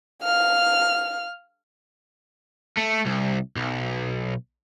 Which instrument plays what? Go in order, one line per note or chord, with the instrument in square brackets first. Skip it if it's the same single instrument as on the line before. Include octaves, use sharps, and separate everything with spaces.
[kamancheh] F5 F6
[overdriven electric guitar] A3
C2
B1